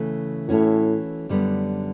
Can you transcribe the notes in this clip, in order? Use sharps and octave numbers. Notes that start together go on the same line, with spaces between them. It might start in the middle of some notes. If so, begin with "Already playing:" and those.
Already playing: C#3 E3 A3
A2 E3 A3 C#4 F#4
F#2 D3 G3 B3